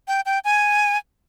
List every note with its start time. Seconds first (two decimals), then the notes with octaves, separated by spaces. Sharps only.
0.08 G5
0.26 G5
0.45 G#5